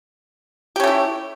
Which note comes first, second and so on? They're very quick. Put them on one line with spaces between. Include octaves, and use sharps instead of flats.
G4 C#4 A3 E4